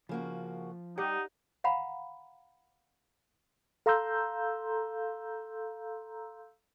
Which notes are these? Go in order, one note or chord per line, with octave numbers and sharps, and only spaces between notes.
C#3 F3 A#3 F#4
G3 D#4 G4 F#5
F5 F#5 A#5 B5
A4 F5 A#5 C6 E6 G6